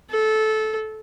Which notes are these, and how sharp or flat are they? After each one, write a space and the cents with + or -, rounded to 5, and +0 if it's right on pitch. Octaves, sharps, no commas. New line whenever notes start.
A4 -20